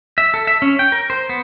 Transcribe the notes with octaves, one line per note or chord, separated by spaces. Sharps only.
E5
A4
E5
C#4
G5
A#4
C5
B3